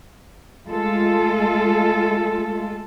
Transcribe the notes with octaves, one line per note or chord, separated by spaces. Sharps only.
G#3 A3 F4 A4